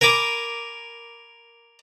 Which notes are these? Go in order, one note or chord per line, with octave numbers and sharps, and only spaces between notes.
A#4 G#5 B5 D6